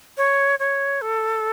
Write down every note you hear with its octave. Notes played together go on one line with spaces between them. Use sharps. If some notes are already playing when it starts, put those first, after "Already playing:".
C#5
C#5
A4